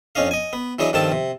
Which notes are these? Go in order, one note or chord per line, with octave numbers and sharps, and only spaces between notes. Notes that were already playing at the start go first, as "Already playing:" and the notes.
F2 C#4 D4 D#5 F5
D#5 G#5
B3
E3 F#3 D4 G#4 D#5
G2 D#3 F3 C4 A4 A5
C3